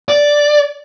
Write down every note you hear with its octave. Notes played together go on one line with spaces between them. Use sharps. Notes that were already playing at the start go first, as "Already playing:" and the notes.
D5